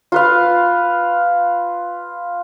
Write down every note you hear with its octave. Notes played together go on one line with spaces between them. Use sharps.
F4 B4 F5